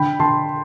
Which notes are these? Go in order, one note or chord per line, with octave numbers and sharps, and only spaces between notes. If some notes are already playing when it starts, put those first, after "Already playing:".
Already playing: D3 G5 B5
D3 A5 C6